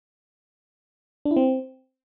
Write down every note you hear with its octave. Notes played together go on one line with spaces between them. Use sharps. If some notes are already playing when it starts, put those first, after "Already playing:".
D4
E4
C4